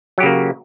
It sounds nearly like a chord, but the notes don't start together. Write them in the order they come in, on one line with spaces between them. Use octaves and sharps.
F#3 G4 C#3 A#3